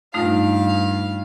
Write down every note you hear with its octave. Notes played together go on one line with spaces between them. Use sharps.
G2 A3 D#4 F4 F5